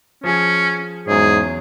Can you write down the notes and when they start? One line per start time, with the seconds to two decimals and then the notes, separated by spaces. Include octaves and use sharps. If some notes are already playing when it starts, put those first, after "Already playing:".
0.24 F3 C#4 G#4
1.07 E2 G#2 F#3 C#4 G#4